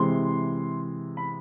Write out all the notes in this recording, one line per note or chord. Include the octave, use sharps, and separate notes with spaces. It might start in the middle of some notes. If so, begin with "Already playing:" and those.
Already playing: C3 E3 G#3 C6
B5